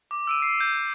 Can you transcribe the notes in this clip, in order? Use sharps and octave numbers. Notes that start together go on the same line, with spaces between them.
D6
E6 D7 D#7
C7
G6